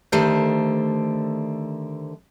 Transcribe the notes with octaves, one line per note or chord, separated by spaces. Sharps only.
D3 D#3 A3 G4 C5